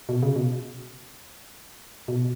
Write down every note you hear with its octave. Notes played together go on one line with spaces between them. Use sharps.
B2
C#3
B2
B2